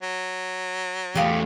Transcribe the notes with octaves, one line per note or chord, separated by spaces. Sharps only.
F#3
E2 A3 G4 F5 D#6